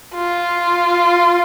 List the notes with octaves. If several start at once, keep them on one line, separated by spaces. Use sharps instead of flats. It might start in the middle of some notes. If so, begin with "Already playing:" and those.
F4